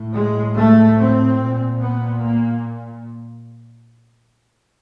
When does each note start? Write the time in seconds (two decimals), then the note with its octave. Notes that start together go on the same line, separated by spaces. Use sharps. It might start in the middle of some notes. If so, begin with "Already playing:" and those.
Already playing: A2
0.14 G#3
0.56 A3
0.98 C4
1.40 A#2
1.81 B3
2.22 A#3